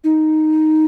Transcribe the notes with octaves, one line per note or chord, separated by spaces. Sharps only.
D#4